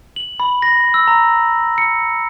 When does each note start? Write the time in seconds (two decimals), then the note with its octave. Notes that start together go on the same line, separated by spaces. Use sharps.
0.16 F#7
0.40 B5
0.62 A#6
0.94 E6
1.08 A#5
1.78 C#7